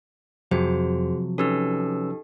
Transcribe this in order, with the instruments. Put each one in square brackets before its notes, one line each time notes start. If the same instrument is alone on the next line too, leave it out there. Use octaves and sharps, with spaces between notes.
[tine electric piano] F2 [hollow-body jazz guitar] C3 F3 F#3 [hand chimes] F#4 G#4 C5
[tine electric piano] C#4 B4 E6 [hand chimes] D#4 G4 A4